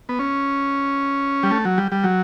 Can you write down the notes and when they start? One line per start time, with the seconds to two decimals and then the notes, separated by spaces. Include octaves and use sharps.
0.09 B3
0.19 C#4
1.43 G3
1.51 A3
1.65 F#3
1.78 G3
1.92 G3
2.04 F#3